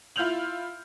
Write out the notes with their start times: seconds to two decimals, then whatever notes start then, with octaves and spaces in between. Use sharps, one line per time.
0.16 E4 F4 F6 G6 F7 F#7